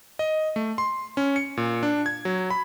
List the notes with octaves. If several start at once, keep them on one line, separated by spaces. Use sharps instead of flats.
D#5
A3
C6
C#4
C#7
A#2
D4
G#6
F#3
B5